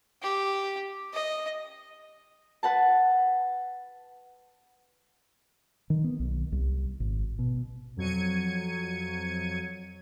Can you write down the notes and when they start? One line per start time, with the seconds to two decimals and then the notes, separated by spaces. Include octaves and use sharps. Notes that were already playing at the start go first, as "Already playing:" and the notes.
0.22 G4
1.13 D#5
2.63 B4 F#5 A5
5.90 D#3
6.04 B3
6.19 B1
6.52 C2
7.00 G#1
7.39 B2
7.97 F2 F#3 G#6 C#7 D#7